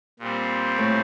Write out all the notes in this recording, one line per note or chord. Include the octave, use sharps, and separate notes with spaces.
A#2 G3 C4
A2 A3